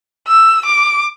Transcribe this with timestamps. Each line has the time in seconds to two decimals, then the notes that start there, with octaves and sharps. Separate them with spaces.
0.27 E6
0.66 D6